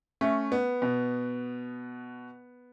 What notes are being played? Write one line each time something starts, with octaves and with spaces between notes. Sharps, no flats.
A3 C#4
B3
B2